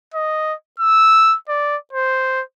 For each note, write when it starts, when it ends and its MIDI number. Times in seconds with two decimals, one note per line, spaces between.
0.14 0.54 75
0.79 1.36 88
1.48 1.77 74
1.93 2.43 72